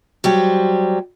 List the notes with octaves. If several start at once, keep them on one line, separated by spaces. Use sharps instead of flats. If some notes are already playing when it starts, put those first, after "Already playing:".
F#3 G3 G4 C5